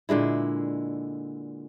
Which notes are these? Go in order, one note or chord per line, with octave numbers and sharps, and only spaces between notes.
A#2 D3 G#3 E4